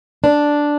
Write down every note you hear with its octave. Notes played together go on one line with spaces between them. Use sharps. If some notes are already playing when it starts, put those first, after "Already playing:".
D4